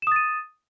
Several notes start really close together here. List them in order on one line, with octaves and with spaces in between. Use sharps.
E7 D#6 A6 D#7